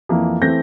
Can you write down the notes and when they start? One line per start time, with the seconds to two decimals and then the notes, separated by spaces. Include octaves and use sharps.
0.09 F2 E3 A#3
0.42 E3 A3 C4 G6 A#6